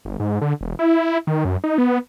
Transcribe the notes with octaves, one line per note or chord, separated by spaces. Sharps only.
G1
G#2
D3
E1
E4
D#3
F#2
D#4
B3